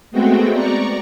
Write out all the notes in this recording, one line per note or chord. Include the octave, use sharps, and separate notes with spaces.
G#3 A3 B3 C4 F#4 G5
D5 A#5 C#6